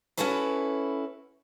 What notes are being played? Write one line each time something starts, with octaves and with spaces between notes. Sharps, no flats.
C#4 D#4 E4 F#4 A4 B4